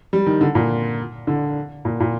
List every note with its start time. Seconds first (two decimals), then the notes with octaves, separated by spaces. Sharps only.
0.13 G3
0.26 D#3
0.41 D3
0.55 A#2
1.27 D3
1.85 A#2
2.00 A#2